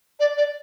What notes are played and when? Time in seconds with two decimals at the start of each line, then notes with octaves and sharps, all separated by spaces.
0.20 D5
0.37 D5